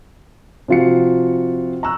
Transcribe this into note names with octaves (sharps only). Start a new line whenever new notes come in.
C3 F3 F4 F#4 C#7
A#5 C#6 E6 F#6